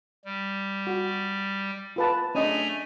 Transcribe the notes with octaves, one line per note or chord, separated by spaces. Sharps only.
G3
F#4
F4 B4 A5
A3 C#4 D4 D#5 G#5 A#5